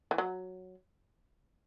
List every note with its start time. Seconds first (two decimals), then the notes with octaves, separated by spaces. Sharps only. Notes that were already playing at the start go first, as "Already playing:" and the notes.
0.11 E3
0.18 F#3